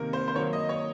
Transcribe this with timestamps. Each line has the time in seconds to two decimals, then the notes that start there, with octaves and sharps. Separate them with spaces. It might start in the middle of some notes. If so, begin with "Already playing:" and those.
Already playing: C3 D#3 A#3 A#4
0.13 C5
0.28 C5
0.36 D#3 F#3 A#3 C#5
0.53 D#5
0.69 C#5